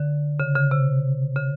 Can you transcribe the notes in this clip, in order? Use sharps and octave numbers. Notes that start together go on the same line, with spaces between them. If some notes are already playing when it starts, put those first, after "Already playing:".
Already playing: D3
C#3
C#3
C3
C#3